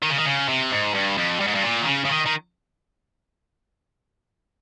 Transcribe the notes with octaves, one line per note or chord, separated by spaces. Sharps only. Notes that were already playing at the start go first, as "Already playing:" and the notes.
D#3
C#3
D#3
C#3
C3
G#2
G2
F2
G2
G#2
G2
A#2
D#3
C#3
C#3
D#3
D#3